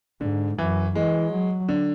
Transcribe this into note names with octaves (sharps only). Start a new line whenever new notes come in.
G#2 D3
F#2 E3
E3 G#3
F#3
D3